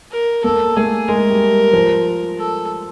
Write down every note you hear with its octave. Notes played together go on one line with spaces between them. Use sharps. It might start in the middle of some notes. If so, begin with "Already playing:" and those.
A#4
A#3 A4
A3 G#4
G#3 A#4
G3
F3
A4